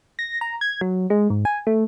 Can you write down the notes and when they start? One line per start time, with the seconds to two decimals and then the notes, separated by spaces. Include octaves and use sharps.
0.19 A#6
0.41 A#5
0.61 G#6
0.81 F#3
1.10 G#3
1.30 G#2
1.45 G#5
1.67 A3